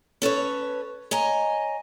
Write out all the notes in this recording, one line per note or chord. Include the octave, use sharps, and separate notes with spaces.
C#4 A4 B4 C#5
C#5 D#5 G#5 A#5